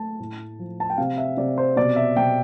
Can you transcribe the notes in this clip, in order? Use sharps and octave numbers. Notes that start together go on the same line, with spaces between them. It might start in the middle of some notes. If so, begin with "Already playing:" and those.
Already playing: A3 A5
A2
F3
A5
G5
C3 F5
E5
C3 D5
C5
B2 D5
E5
B2 G5